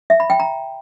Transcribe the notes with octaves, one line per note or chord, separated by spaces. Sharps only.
E5
B5
G5
A#5